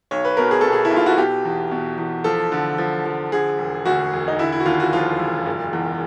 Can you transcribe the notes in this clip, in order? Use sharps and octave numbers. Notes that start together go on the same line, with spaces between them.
B1 C#5
B4
B2 A#4
G#4
B2 A4
G#4
E4
B1
F4
F#4
B2 G4
E2
B2
E2
F3 A4
D3
F3
F3
D3 G#4
E1
D2 F#4
E1
D#4
D3 E4
E4
F#4
D#2 F4
F#4
F3 F4
E1
F#1
E2